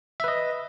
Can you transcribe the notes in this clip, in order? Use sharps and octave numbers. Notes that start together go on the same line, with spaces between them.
B4 D#5 E5